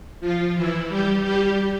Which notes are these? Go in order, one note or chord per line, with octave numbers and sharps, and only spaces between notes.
F3 F4
E3 E4
G3 G4
G3 G4